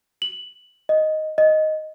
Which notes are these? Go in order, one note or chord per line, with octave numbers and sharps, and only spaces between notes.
F#7
D#5
D#5